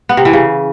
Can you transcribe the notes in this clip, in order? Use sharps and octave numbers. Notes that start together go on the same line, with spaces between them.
B3
C3
E3
C#3